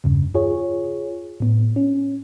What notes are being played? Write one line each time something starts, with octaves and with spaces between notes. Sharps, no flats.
E2 G2 C#3
F4 G#4 C#5
A2 B3
C#4